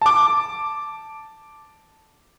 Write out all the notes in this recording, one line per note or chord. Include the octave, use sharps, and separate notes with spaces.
A5 D6